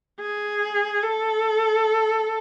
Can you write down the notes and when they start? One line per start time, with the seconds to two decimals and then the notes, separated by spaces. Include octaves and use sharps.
0.21 G#4
1.03 A4